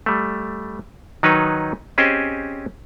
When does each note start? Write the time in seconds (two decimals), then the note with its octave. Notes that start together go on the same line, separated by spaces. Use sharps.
0.06 G3 A3
1.23 D#3 F#3 D#4 B4 C#5
1.98 C4 C#4 G4 G#4 C5 D#5